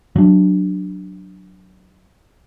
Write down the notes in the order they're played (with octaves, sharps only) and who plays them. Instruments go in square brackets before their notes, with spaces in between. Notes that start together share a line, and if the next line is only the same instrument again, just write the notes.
[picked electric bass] F#3 D4